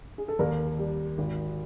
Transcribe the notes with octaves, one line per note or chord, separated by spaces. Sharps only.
G#4
A4
D#2 A#4
G3
G#1